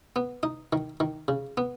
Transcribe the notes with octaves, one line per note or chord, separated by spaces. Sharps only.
B3
D#4
D#3
D#3
C#3
B3